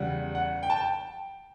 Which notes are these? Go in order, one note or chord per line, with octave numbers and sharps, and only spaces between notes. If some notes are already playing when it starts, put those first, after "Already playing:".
Already playing: E2 C#3 G3 F#5
F#5
G5
A5
G5